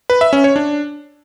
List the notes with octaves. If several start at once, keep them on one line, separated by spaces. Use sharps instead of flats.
B4
E5
C#4
C#5
D4